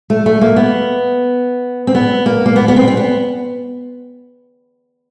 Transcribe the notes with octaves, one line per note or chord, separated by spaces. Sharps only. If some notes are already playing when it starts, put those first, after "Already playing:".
A3
A3
A#3
B3
C4
B3
A#3
A#3
B3
B3
C4
C4
B3